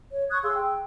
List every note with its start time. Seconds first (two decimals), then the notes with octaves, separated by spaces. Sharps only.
0.11 C#5
0.31 C#6 D#6 F#6 G#6
0.44 G#4 F5 C6 E6
0.56 G5